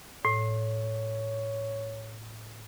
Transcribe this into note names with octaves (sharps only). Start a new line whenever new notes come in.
A2 C#5